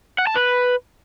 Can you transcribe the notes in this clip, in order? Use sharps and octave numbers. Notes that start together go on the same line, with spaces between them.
F#5
A5
B4